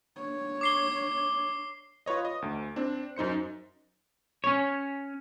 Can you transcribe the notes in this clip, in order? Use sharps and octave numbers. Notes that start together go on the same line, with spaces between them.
D4 C#5
D6 C7 G7
F4 B4 C#5 D#5
D#5
D2
C4 D4
F#2 D#4 C5 C#7
C#4 C#5